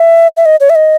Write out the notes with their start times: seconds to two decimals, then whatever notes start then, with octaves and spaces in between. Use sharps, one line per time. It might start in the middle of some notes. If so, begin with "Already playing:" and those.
Already playing: E5
0.37 E5
0.46 D#5
0.60 C#5
0.70 E5
0.75 D#5